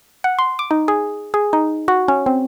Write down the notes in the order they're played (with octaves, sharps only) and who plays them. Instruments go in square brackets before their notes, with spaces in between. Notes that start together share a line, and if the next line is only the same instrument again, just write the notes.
[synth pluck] F#5
C6
D6
D#4
G#4
G#4
D#4
F#4
C#4
C4